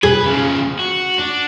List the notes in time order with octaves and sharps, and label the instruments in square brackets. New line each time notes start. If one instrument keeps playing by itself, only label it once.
[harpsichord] G#4 [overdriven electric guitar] B4
[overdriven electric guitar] C#3 F3
F#4
D4